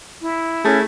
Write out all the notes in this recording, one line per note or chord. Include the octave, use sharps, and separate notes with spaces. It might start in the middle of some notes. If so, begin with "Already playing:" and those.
E4
A3 C#4 G#4